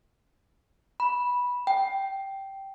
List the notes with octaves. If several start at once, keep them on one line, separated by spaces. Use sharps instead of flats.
B5
G5